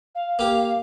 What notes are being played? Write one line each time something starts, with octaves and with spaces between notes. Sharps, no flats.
F5
A#3 G4